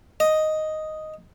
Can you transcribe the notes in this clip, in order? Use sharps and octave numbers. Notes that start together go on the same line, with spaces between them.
D#5